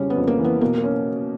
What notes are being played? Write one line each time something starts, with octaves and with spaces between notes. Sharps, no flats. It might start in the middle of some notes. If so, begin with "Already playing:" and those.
Already playing: F2 C#3 G3 C#4
B3
F2
A#3
E3
B3
B2 A#3
A#3
C#4